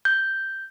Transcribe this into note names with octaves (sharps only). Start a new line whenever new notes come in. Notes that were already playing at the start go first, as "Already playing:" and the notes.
G6